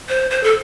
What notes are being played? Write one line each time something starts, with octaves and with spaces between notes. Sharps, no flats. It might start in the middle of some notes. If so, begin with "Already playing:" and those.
C5
C5
A4